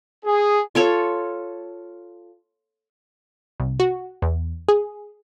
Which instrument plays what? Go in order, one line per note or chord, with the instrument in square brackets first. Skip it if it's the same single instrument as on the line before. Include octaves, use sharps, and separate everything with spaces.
[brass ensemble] G#4
[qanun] F4 A4 C#5
[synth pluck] C2
F#4
E2
G#4